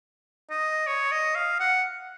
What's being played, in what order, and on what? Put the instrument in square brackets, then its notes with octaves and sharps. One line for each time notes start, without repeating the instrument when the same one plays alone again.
[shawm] D#5
C#5
D#5
F5
F#5